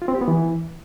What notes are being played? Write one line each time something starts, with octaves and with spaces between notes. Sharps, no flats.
F4
C4
G4
B3
E3